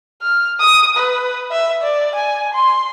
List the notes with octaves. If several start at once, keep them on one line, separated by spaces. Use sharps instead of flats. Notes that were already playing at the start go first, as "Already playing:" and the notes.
F6
D#6
B4
E5
D5
G#5
C6